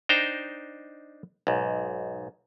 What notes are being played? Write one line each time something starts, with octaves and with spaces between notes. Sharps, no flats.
D4 D#4 C5 G5 A#5
B1 G#2